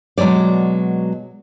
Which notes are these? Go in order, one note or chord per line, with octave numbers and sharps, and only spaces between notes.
B2 F#3 G#3 C#5 D5